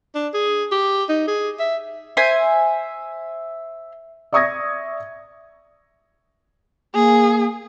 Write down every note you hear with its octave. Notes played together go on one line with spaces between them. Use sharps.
D4
G#4
G4
D#4
G#4
E5
C5 E5 G#5
D5 E5 C#6 D#6 G#6 A#6
A#3 G#4